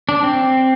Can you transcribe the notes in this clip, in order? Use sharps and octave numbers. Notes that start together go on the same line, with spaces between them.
D4
C4